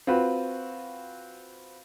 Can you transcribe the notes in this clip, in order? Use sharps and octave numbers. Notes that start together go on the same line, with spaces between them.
C4 F4 F#4 B4